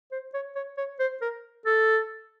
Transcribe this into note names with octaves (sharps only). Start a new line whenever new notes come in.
C5
C#5
C#5
C#5
C5
A#4
A4